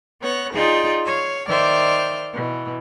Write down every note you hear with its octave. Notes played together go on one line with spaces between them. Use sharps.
B3 C#5 F#6 A#6
D#4 F4 G#4 D5 G5
C#5 F5
D#3 C5 D5 E5 F6 G6
B2 E3